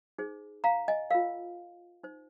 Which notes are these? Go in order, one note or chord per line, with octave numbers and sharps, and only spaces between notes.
D#4 G#4 C5
F5 A#5
D#5 G#5
F4 A#4 F5
D#4 C5